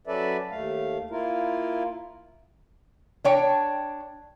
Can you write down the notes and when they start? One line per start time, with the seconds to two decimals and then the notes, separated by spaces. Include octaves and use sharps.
0.07 F#3 C#4 A4 B4 D5 E5
0.51 D#2 A3 F5
1.10 A#3 E4 F4 A#4
3.25 D4 C#5 G5